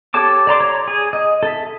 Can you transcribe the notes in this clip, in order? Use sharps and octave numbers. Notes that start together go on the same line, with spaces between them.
G4 A4 C#5 A5 D6
D5 A#5 C6 D6
C#5 A#5
G#4
D#5
A4 E5